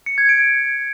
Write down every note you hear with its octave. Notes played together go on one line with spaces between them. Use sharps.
C#7
G#6
D7